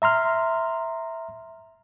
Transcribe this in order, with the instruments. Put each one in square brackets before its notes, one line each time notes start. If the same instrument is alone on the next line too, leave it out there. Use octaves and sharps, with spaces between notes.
[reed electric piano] E5 A#5 C6 F6